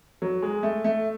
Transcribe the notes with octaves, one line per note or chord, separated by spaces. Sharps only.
F#3
G#3
A3
A3